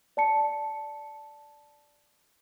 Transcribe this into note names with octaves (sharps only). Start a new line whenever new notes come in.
D5 A5 C#7